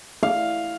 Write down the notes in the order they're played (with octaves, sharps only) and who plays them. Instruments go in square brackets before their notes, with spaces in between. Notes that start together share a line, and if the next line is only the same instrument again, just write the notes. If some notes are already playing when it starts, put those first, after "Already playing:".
[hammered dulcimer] F5